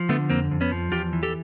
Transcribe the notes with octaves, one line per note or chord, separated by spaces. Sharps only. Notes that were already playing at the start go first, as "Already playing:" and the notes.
Already playing: F3
D3 A3 B3
F2 A#3 C4
F2
B3 C#4
F3
E2 F4 G4
E3
G4 A4